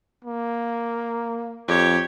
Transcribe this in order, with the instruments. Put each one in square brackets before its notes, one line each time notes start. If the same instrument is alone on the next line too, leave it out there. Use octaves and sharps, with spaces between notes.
[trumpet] A#3
[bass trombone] F2 [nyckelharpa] G4 C#5